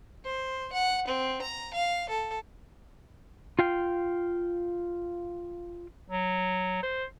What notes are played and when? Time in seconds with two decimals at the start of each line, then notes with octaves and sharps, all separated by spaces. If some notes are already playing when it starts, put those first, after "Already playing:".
0.25 C5
0.73 F#5
1.08 C4
1.42 A#5
1.74 F5
2.09 A4
3.59 F4 F5 G5
6.10 F#3
6.83 C5